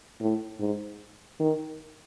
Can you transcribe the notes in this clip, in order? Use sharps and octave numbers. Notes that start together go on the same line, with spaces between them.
A2
G#2
D#3